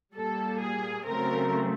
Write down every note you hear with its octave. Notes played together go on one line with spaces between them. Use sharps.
A#2 G3 A#3 A4
G#4
C#3 F#3 A3 C4 A#4